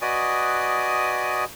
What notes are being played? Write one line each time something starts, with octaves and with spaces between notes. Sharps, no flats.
F#4 B4 D5 D#5 G#5 D#6